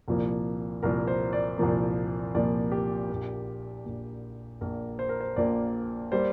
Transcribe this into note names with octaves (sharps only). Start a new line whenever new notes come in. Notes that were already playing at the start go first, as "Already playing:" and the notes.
C2 A#2 F3 A#3
C2 A#2 F3 A#3 A#4
C5
D5
C2 A#2 F3 A#3
C2 A#2 F3 A#3 D5
G4
A#1 A#2 A#3
A#1 A#2 A#3
A#1 A#2 A#3 A#4
C5
A#4
C5
A#1 A#2 A#3 D5
G3 A#3 C5